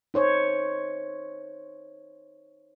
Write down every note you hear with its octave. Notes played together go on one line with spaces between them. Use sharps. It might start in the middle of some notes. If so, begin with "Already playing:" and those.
D#4 C5 C#5